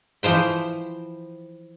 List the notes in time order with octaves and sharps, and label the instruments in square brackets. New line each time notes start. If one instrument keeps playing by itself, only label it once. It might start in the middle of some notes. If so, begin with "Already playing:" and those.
[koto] E3 F3 C5 G5